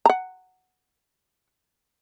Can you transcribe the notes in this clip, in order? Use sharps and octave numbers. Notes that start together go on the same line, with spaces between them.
F#5 A#5